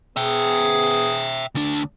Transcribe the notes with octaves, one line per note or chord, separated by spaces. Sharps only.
B3 G#4 E5 G5
D2 D4